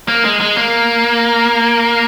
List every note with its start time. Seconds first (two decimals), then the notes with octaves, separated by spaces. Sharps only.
0.08 A#3
0.24 G#3
0.41 G#3
0.57 A#3